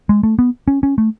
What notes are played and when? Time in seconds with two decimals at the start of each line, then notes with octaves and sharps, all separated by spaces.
0.09 G#3
0.23 A3
0.39 B3
0.68 C#4
0.83 C#4
0.98 A3